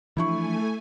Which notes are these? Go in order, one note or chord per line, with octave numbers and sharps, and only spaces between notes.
E3 F3 A3 D4 E4 G#5 C#6